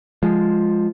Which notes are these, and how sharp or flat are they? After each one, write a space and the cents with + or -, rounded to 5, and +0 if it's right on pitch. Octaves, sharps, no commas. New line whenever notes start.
F3 +0 G#3 +0